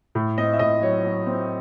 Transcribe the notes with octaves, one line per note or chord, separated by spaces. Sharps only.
A2
C4 D#5
E5
A2 D#5
F#3 C#5
F#3
C4